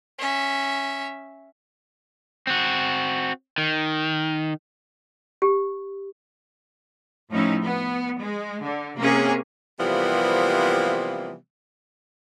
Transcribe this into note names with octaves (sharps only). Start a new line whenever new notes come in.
C#4 E5
C4 F#4
D#3
G4
A2 F3 C#4 D#4 E4
B3
G#3
D3
C3 A#3 C#4 G#4
C3 E3 F3 G3 A#3 B3